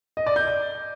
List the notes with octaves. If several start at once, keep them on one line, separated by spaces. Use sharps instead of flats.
D#5
D5
G6